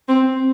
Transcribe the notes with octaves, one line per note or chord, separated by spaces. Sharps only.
C4